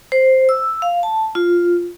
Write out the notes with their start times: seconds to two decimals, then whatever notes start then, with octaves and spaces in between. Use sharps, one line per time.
0.12 C5
0.49 E6
0.82 F5
1.03 A5
1.35 F4